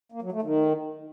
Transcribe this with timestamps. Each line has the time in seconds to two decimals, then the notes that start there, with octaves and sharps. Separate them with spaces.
0.12 A#3
0.22 F#3
0.32 A3
0.42 D#3